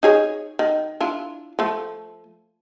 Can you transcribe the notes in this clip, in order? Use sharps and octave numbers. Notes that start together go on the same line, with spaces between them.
D#4 G#4 C#5
D#3
D4 E4 F4
F3 A3